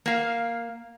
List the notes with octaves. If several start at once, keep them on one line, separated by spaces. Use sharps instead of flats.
A#3 F5